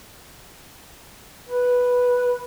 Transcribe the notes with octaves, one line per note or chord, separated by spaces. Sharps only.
B4